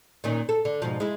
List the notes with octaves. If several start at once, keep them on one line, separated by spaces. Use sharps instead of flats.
A#2 D#3 C#4
A4
D3
G#2 B2 F3
G#3 E4